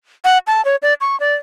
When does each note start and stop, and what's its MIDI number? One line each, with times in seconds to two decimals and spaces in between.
0.25 0.38 78
0.47 0.64 81
0.65 0.76 73
0.82 0.94 74
1.01 1.18 85
1.20 1.35 74